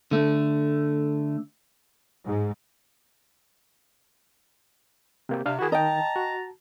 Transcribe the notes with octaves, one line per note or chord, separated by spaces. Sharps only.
D3 A3
G#2
C3 A#3 G4
C3 D4 F5
D#3 E4 F#4 G#4
D#3 D#5 G5 A5 A#5
F#4